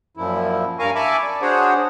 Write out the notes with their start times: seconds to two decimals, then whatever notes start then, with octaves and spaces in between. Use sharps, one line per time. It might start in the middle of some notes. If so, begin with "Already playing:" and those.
0.17 F#2 A#2 F3 E4
0.79 G2 A#4 F5 G#5 A#5 C#6
0.95 E5 G#5 A5 B5 C#6 D6
1.23 D5
1.42 D4 F#4 G#4 C5 C#5 F#5